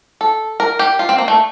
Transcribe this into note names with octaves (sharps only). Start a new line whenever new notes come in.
A4
A#4
G4
F4
C4
A#3
A3